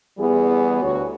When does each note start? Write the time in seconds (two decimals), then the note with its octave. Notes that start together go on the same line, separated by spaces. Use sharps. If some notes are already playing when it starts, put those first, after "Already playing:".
0.18 E2 E3 G3 B3 G#4
0.82 D2 F#4 C#5